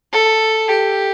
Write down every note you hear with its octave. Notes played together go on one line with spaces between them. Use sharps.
A4
G4